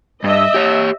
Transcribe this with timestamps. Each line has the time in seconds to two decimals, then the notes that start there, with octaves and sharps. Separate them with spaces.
0.24 G2 D#5 E5
0.54 G4 C#5